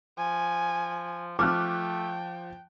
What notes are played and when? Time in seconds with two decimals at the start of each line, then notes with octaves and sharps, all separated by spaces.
0.18 F3 G#5
1.39 F3 A3 G5 D6 F6 F#6